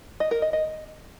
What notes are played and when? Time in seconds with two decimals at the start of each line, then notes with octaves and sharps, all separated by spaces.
0.20 D#5
0.31 A#4
0.42 D#5
0.53 D#5